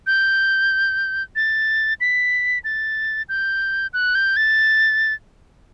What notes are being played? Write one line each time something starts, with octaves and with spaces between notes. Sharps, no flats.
G6
A6
B6
A6
G6
F#6
G6
A6